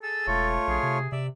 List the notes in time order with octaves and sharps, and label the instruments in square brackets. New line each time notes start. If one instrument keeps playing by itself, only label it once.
[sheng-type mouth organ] G#4 E6 [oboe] A4
[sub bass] E1 [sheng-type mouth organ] A3 F4 C#5
[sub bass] A#1 [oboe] G#4
[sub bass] C3
[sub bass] C3 [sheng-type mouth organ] D5 E5